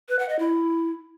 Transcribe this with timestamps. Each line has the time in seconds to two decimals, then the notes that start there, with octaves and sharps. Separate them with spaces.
0.09 B4
0.19 F#5
0.29 D#5
0.39 E4